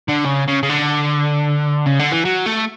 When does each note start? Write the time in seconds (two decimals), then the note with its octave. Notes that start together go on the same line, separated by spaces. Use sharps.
0.09 D3
0.26 C#3
0.48 C#3
0.63 C#3
0.70 D3
1.86 C#3
1.99 D3
2.12 E3
2.25 F#3
2.46 A3